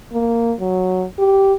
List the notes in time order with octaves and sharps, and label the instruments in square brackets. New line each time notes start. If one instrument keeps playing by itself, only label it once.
[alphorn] A#3
F#3
G4